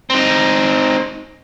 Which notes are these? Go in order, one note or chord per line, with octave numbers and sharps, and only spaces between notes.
C4 D#4